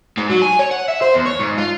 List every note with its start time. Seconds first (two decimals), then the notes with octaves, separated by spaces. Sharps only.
0.17 G#2
0.30 F#3
0.42 G#5
0.59 C#5
0.71 F#5
0.88 E5
1.02 C5
1.14 E2
1.26 C#5
1.39 G#2
1.58 F4